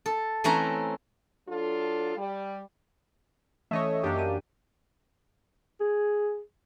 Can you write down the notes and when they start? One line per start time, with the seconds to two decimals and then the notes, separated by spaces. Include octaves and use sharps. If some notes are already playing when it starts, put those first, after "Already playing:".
0.06 A4
0.44 E3 A3 C4 C#4 E4 A#5
1.48 F#3 D4 F4 A4
2.16 G3
3.71 E3 A3 C#4 C#5 D#5 E5
4.03 F#2 A#3 D4 G4
4.19 D#7
5.81 G#4